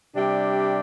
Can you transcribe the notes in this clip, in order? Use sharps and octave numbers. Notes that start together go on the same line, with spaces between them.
C3 G3 D4 G4